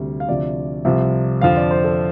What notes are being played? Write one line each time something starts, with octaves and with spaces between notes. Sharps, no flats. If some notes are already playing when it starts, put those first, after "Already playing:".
Already playing: D2 C3 G3
F5
D2 C3 F3 D5
C2 C3 F3
F2 D3 F3 F5
D5
C5
A4